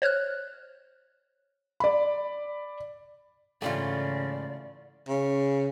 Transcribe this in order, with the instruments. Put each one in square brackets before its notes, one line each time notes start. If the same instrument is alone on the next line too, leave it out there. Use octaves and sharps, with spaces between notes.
[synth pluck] C5 C#5 F6 F#6
[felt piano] D5 B5
[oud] G#2 E3 G4 [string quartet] C#3 [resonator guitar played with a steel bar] A3 F4 [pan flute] D5
[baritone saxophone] C#3